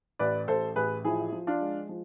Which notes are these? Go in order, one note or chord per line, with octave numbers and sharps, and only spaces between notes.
A1 B4 D5
A1 A4 C5
A1 G#4 B4
F3 E4 G#4
F3
D4 F4
G#3
F3